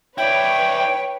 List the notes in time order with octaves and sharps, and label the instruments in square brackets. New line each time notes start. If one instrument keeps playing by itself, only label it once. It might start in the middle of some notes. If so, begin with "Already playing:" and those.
[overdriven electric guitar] E4 D5 [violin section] B4 C#5 [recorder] G5